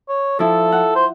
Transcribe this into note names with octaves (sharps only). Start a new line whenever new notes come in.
C#5
F3 E4 A4
F#5
C5